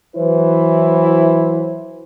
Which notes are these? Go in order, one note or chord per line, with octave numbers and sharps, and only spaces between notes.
E3 F#3 E4 B4 C5